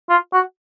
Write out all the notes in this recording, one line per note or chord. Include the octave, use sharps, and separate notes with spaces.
F4
F#4